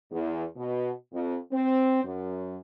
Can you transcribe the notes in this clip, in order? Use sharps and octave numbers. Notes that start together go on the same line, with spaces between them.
E2
B2
F2
C4
F#2